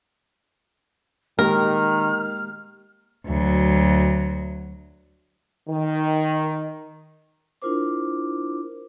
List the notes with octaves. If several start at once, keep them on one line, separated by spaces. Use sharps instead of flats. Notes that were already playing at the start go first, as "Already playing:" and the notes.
D#3 G#3 A#3 G4 A#4 F6
D2 F#3
D#3
D4 E4 F4 A#4 C5 D6